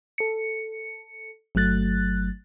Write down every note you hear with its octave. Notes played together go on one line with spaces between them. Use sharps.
A4 C#7
G1 F#3 A3 F#6 A6